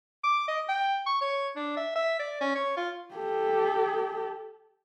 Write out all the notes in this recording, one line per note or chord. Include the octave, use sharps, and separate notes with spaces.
D6
D#5
G5
C#6
C#5
D4
E5
E5
D5
C#4
C#5
F4
G4 A4